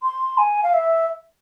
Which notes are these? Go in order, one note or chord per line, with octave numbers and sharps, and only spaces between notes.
C6
G#5
F5
E5